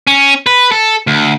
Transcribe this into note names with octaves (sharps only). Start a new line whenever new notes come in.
C#4
B4
A4
D2